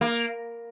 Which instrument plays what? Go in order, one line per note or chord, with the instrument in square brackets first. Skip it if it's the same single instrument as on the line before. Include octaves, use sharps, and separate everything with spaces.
[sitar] A#3